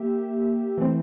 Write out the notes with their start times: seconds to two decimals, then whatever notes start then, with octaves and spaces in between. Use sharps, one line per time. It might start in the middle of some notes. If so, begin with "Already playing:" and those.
Already playing: A#3 G4 E5
0.78 E3 A3 C4